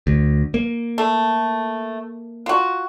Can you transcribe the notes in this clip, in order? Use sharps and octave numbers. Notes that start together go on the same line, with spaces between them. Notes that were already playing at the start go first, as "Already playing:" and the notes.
D2
A#3
A3
F4 F#4